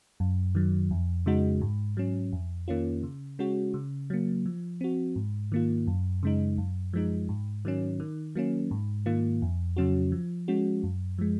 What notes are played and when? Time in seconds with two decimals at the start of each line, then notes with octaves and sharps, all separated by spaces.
0.20 F#2
0.55 D#3 F#3
0.91 F2
1.26 C#3 G#3 D#4 F#4
1.61 G#2
1.97 F#3 C#4
2.32 F2
2.68 D#3 A#3 C#4 F4
3.03 C#3
3.39 G#3 C#4 F#4
3.74 C#3
4.10 F#3 A#3
4.46 F3
4.81 C4 F#4
5.16 G#2
5.52 D#3 A#3 F4
5.87 F#2
6.23 C#3 G#3 D#4
6.58 F#2
6.93 F3 G#3 D#4
7.29 G#2
7.65 D#3 F#3 C#4
8.00 D#3
8.35 F#3 A#3 C#4
8.71 G#2
9.06 D#3 A#3 F4
9.42 F2
9.76 C#3 F#3 C#4 F#4
10.12 F3
10.48 G#3 C#4 F#4
10.83 F#2
11.18 F3 G#3